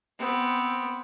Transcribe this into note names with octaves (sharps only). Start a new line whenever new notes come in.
B3 C4